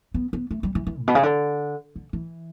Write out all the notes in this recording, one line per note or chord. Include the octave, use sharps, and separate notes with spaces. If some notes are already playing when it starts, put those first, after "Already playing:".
B3
B3
A3
G3
E3
E3
A2
B2
C#3
D3
D3
E3